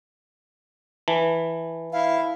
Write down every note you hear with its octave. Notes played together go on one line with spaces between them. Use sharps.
E3 A5
E4 F5